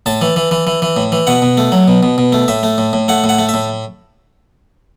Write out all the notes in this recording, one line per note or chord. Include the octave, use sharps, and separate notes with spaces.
A2 A5
E3
E3
E3
E3
E3
A2
E3
B2 F#5
B2
A3
F#3
B2
B2
B2
A3
A2 E5
A3
A2
A2
A3 F#5
A2
F#5
A3
E5
A2